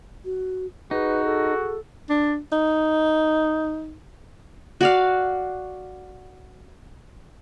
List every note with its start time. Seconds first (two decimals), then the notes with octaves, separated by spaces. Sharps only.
0.25 F#4
0.91 D#4 F#4 G#4 B4
1.25 A4
2.10 D4
2.52 D#4
4.81 F#4 D5 F5